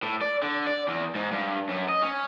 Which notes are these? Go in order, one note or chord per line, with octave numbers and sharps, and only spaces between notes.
A2
D5
D3
D5
E2
G#2
G2
F#2
D#5
C#4